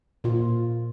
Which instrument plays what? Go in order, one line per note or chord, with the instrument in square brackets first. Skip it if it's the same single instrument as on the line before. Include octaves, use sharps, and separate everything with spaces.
[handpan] A#2 F4